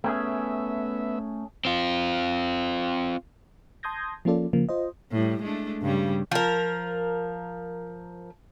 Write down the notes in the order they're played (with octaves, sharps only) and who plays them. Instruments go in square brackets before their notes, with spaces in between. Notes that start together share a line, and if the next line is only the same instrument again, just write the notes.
[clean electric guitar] A3 C#4 G#4 [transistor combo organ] B3 E5
[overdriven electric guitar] C4 F4
[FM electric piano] A5 C6 D#6 G6 G#6 A#6
F3 A#3 C#4 F4 A4 D5
C#3 F3 A#3
F4 C5 D#5
[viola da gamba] A2 G3
G#3 A3 D4
G2 C#3 G3
[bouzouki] F3 A#4